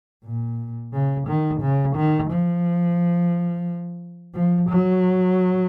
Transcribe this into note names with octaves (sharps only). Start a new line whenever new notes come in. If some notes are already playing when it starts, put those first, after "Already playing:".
A#2
C#3
D#3
C#3
D#3
F3
F3
F#3